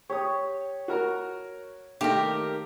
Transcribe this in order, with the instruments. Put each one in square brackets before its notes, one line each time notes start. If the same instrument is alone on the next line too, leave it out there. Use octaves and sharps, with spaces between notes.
[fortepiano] G4 D#6 [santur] C#5
[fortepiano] F#4 A#4 A#5
[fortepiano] D#3 A3 A#3 [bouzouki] G4 A#4